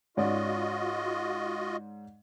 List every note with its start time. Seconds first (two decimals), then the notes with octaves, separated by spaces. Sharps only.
0.17 G#2 C#4 F4 F#4 D5 D#5